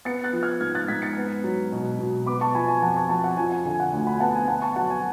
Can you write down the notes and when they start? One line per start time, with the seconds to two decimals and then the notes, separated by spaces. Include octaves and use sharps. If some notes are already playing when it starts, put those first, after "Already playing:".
0.05 B3 A6 C#7
0.24 F#6 A6
0.33 F3
0.43 F6 G#6
0.61 G#2 F6 G#6
0.75 F#6 A6
0.88 G#2 G#6 B6
1.02 A6 C#7
1.17 B3
1.44 F#3
1.72 B2
1.99 B2
2.26 B3 B5 D6
2.41 A5 C#6
2.55 F3 G#5 B5
2.68 G#5
2.82 F2 F#5 A5
2.96 A5 C#6
3.09 F2 A5 C#6
3.24 F#5
3.37 F3 G#5
3.52 G#5
3.65 D3 G#5
3.80 F#5
3.92 D2 G#5
4.07 G#5 B5
4.20 B3 F#5 A5
4.35 G#5
4.48 B3 F#5 A5
4.62 A5 C#6
4.76 F#3 F#5 A5
4.90 G#5